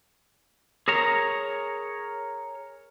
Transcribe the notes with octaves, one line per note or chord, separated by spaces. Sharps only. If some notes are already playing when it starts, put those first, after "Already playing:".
G#4 A#4 C#5 A#5